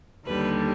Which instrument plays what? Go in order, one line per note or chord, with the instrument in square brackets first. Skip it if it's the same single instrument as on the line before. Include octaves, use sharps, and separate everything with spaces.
[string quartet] D#2 D3 G3 B4